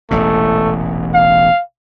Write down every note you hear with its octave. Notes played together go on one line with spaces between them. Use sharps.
E1 A1 A#2 A3
F5